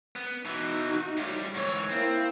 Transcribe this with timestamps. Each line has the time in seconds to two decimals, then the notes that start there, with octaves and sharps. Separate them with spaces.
0.16 B3
0.45 B2 E3 D#4 F#4
1.17 A2 G3
1.55 G#2 E3 C#5
1.89 A#3 C4 E4